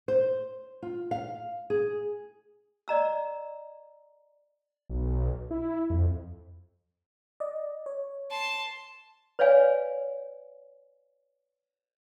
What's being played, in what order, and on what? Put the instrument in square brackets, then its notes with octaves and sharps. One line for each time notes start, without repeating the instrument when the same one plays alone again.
[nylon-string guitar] C5
F4
F5
G#4
[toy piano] D5 D#5 A#5 E6
[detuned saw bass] B1
E4
F2
[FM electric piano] D5 D#5
C#5
[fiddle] A5 C6
[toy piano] B4 C#5 D5 F5 G#5